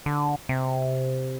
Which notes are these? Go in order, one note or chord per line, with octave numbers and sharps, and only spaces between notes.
D3
C3